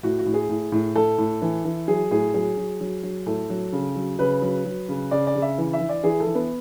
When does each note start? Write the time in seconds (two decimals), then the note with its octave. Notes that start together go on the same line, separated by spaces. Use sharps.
0.03 A2 F#4
0.19 F#4
0.26 A2
0.34 G#4
0.49 A2
0.72 A2
0.96 A2 A4
1.18 A2
1.42 E3
1.65 E3
1.88 F#3 G#4
2.11 A2 G#4
2.34 F#3 G#4
2.57 F#3
2.81 F#3
3.03 F#3
3.26 A2 A4
3.50 F#3
3.72 C#3
3.96 F#3
4.19 C#3 B4
4.42 F#3
4.65 F#3
4.88 C#3
5.11 C#3 D5
5.27 D5
5.35 C#3
5.42 E5
5.58 E3
5.73 E5
5.80 E3
5.89 D5
6.04 E3 G#4
6.20 A4
6.27 E3
6.35 B3